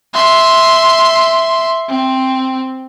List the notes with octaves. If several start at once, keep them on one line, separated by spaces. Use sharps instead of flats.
E5 C6
C4